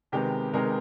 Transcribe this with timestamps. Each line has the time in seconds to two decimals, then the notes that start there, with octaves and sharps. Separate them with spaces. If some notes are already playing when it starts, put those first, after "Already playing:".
0.12 C3 D#3 G#3 B3 G4
0.53 C3 D#3 G#3 B3 A#4